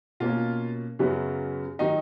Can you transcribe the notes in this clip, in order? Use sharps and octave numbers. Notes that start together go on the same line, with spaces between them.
B2 A#3 C#4 F4
F#2 C#3 F#3 B3
D#3 F#3 D#4